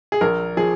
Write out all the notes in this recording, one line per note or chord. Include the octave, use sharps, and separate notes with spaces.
G#4
A#1 A#4
F3 G#4